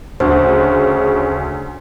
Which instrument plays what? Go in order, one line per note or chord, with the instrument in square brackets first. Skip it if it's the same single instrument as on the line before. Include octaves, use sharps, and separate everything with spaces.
[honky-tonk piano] D2 [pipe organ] C#3 [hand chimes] C5